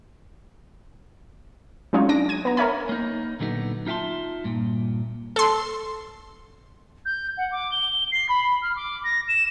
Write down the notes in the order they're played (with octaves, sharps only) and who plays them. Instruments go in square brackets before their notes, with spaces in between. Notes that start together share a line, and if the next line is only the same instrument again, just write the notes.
[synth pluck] F#3 G#3 C#4 D#4 F4 C#5
D4 A#6 D7
G#6 D#7
B3 A#5
A#4 C#5 E5 G#5 B5
[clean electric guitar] A#3 D#4
A#2 D3 F#3 G3 B3 D#4
D#4 F4 E5 G5 A5 C6
G2 A#2
[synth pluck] A4 C6
[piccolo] G6
F#5
D6
G7
C7
B5
F6
D6
A#6
E7